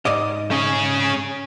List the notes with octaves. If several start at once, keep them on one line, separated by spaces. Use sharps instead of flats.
G#2 D5 D#5
C#4 G#4